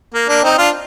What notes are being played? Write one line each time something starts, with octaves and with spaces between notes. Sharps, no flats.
A#3
A#3 D4
C4 D#4
D4 F4